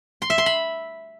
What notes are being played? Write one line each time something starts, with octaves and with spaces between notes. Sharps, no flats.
C6
E5
C6
B5